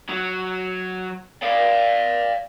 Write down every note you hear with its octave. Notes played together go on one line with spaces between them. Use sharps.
F#3
D5 F5